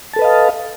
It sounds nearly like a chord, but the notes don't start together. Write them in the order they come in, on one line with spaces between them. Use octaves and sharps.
A5 A4 B4 D#5 F5